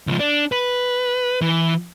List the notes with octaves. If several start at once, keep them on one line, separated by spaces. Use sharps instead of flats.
C#2 F3
D4
B4
E3